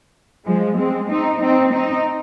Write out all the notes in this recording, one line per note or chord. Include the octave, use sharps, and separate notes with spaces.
F3 G#3
G#3 C4
C4 D#4
C4 D#4
C4 D#4